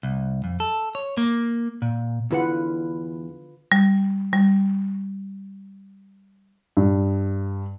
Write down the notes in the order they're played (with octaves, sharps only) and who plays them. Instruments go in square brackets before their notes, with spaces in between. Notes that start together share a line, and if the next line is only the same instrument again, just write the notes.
[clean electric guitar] C2
F2
A4
C#5
A#3
A#2
[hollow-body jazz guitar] E2 E4 F#5 [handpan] D3 F4 B4
[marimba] G3
G3
[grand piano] G2